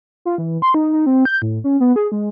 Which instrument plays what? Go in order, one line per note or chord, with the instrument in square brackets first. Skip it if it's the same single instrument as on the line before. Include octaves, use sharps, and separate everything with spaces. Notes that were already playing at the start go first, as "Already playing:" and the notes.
[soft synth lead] F4
E3
C6
D#4
D#4
C4
G6
A2
C#4
B3
G#4
G#3